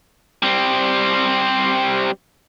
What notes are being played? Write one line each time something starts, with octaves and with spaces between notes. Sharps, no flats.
G3 C4